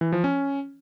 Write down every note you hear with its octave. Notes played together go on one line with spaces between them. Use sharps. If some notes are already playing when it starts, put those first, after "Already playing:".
E3
F3
C#4